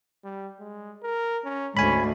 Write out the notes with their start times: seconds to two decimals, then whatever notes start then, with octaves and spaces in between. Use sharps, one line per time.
0.24 G3
0.60 G#3
1.03 A#4
1.45 C#4
1.77 D2 G#2 D3 C#4 G#5 B5